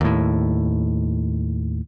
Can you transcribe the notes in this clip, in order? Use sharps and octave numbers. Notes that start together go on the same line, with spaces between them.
D#2 A2